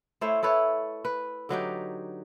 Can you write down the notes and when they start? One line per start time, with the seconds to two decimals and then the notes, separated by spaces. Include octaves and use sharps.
0.21 A3 E4 C5 C#5
0.43 E4 A4 B4 C#5
1.05 B4
1.49 D3 F#3 D#4 G4